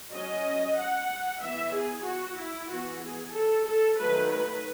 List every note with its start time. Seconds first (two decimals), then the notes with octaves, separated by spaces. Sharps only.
0.12 F#3 C#4 D#5
0.77 F#5
1.41 E3 B3 E5
1.74 G#4
2.06 F#4
2.38 E4
2.70 E3 B3 F#4
3.02 G#4
3.34 A4
3.66 A4
3.99 D#3 F#3 A3 B4
4.32 B4